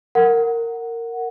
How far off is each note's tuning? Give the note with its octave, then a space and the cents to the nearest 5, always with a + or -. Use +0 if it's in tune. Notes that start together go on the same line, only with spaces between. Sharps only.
A#4 -15 F#5 +0